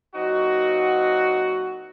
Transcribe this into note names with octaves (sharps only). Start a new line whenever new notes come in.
A#2 F#3 C4 D#4 F#4